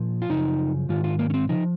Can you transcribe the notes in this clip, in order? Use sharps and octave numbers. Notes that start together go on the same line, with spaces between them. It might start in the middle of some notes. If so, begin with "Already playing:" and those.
Already playing: A#2 F3
F4
F#2 C#3 F3 D#4
G#2 D#3 F4
F4
A#3
C#4
C4
C#3 F3 D#4